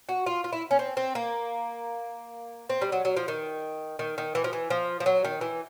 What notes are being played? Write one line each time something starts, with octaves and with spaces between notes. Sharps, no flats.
F#4
F4
F4
E4
C#4
C4
C4
A#3
C4
G3
F#3
F#3
F3
D#3
D#3
D#3
E3
F3
E3
F3
F3
F#3
D#3
E3